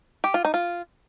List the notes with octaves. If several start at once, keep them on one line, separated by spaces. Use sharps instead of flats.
G4
F4
D#4
F4